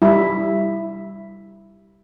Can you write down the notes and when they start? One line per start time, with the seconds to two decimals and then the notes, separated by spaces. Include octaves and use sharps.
0.02 G3 E4